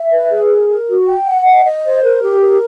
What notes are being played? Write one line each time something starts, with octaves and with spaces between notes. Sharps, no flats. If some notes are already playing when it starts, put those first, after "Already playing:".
Already playing: E5
B4
G#4
A#4
A#4
F#4
G5
F#5
D#5
D#5
C5
A#4
G4
A#4